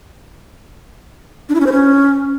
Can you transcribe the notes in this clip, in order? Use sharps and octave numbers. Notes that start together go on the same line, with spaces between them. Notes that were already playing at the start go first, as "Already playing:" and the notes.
D4
E4
C#4
C5
C#4